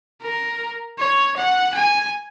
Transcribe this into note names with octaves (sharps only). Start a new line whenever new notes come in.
A#4
C#5
F#5
G#5